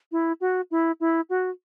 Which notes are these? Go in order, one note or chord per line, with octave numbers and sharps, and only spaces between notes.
E4
F#4
E4
E4
F#4